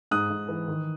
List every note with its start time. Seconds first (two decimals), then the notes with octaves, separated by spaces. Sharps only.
0.11 G#2 D#6 F#6
0.30 G#2
0.48 E3
0.68 D#3